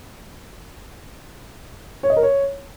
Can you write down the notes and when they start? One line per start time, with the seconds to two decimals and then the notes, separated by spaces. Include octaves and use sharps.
2.03 C#5
2.10 D#5
2.16 A#4
2.23 C#5